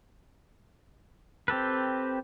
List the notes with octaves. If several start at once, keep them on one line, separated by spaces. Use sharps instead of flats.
C4 G4 A4 B4